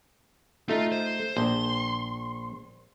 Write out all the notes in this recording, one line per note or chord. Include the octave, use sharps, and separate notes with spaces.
A3 D#4 F4
C5
A#1 C6